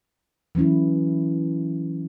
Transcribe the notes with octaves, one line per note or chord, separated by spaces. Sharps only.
E3 F#3 C#4 E4